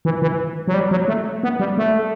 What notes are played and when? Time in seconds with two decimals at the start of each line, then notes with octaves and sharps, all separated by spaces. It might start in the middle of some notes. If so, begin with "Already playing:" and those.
0.05 E3
0.22 E3
0.68 F#3
0.74 G3
0.91 F#3
1.08 A3
1.43 B3
1.60 G3
1.78 A3